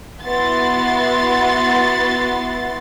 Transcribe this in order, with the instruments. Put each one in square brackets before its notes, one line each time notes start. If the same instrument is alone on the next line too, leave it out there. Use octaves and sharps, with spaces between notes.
[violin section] B3 E4 F#4 C6 A6